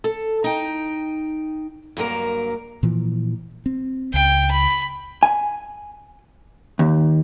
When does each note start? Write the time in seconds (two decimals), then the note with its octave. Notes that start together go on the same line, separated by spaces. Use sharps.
0.04 A4
0.44 D#4 G5
1.97 G2 F#3 A#3 A#4
2.83 A#2 E3 F3
3.66 C4
4.14 C#2 G5
4.52 B5
5.23 G#5
6.79 D#2